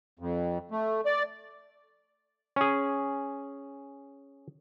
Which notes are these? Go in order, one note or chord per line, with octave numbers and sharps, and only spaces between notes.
F2
A3
D5
C#4 G#4